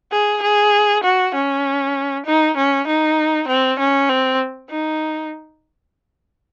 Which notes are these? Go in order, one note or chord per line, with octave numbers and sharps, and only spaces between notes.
G#4
G#4
F#4
C#4
D#4
C#4
D#4
C4
C#4
C4
D#4